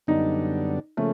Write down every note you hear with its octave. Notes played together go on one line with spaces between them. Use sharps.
F#2 D3 G3 B3 D4 D#4
C#3 F3 A3 A#3 C#4